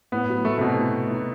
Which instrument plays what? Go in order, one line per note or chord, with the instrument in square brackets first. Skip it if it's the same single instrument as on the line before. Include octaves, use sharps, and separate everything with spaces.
[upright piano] A2 [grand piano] B3
[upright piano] F#3
[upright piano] A2 [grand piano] A3
[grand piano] C3
[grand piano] B2 [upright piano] B3
[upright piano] A2
B3
D#4